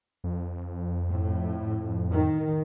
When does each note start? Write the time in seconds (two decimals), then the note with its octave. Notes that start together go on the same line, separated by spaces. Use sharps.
0.24 F2
1.09 A2
2.12 D#3